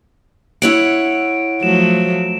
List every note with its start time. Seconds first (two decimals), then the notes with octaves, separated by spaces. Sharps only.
0.62 E4 C#5 F#5 D7
1.63 F3 F#3 A3 E7